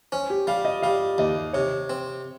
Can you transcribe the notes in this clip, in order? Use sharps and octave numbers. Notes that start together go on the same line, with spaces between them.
C#4 C5
G4
G3 F5
D#5
G3 F5
D#2 D#5
C3 C#5
C4